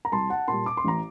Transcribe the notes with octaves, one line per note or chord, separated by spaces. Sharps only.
A#5
C2 A5 C6
F#5 A5
A#2 G3 A5 C6
D6
C6
A1 A#5